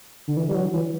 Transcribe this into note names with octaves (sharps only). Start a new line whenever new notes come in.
D3
E3
G3
F#3
E3